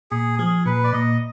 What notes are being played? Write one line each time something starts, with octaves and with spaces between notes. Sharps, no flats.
A#2 G#4
F3 G#4
A#2 B4
D5
A#2 D#5